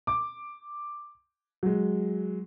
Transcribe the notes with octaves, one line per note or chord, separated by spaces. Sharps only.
D6
F#3 G#3